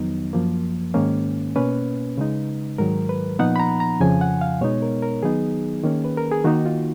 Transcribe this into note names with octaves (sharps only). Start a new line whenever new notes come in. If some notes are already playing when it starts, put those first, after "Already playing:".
Already playing: F2 D#3 F#3 B3 D#4
F#2 F3 A#3
G#2 D#3 A#3 C#4
B2 A#3 C#4 B4
C#3 G#3 D#4
G#2 D#3 F#3 A#4
B4
A#2 F3 B3 D#4 F#5
B5
A#5
A#5
F2 C#3 F3 G#5
F#5
F5
B2 G#3 B3 D#4 C#5
A#4
A#4
D#3 F#3 B3 D#4 G#4
D#3 A#3 C#4
B4
A#4
G#4
D#3 A#3 D#4 F#4
F4